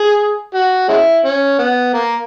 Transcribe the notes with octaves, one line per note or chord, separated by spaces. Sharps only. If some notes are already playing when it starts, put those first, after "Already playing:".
Already playing: G#4
F#4
G#3 C#4 E4
C#4
B3
A#3